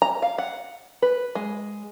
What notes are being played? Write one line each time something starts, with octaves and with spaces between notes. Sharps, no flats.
A#5
F5
F#5
B4
G#3